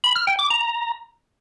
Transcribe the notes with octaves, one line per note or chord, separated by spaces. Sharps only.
B5
F6
G5
D6
A#5